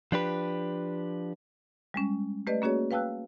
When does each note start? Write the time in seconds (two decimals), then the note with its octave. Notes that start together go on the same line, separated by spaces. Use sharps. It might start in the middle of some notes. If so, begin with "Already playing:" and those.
0.12 F3 D4 G4 B4
1.94 G3 G#3 C#4
2.47 A3 G4 B4 D5 D#5
2.62 A#3 C#4 F#4 G#4 C#5
2.91 B4 F5 G5 A5 E6 F#6